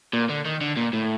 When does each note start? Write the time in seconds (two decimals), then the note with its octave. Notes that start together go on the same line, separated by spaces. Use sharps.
0.13 A#2
0.29 D3
0.45 D#3
0.61 D3
0.77 A#2
0.93 A2